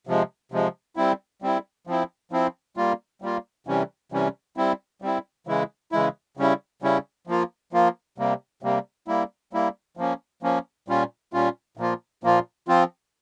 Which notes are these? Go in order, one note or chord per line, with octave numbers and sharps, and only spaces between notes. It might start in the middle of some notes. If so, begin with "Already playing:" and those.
C3 F3 G#3
C3 F3 G#3
G3 C4 E4
G3 C4 E4
F3 C4 E4
F3 C4 E4
G3 A#3 F4
G3 A#3 F4
C3 E3 G3 C#4
C3 E3 G3 C#4
G3 C4 E4
G3 C4 E4
C#3 E3 G#3 E4
C#3 E3 G#3 E4
C#3 G3 C#4 E4
C#3 G3 C#4 E4
F3 A#3 F4
F3 A#3 F4
C3 G3 A#3
C3 G3 A#3
G3 A#3 E4
G3 A#3 E4
F3 A#3 C#4
F3 A#3 C#4
A#2 G3 C#4 F4
A#2 G3 C#4 F4
A#2 F3 A#3 F4
A#2 F3 A#3 F4
F3 C4 F4